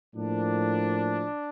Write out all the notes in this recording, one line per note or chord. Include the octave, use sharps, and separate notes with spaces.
A2 F3 A#3 D4